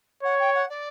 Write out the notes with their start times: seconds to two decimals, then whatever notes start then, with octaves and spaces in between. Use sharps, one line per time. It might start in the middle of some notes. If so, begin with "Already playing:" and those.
0.23 C#5 F#5
0.39 G5
0.55 F#5
0.69 D5